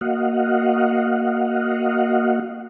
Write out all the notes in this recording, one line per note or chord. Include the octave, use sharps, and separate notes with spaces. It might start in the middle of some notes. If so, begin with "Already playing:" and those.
A#3 F#4 D#5 F5 F#5